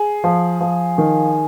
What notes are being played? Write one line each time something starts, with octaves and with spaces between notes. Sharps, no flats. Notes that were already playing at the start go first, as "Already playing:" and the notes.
Already playing: G#4
F3
F3
D#3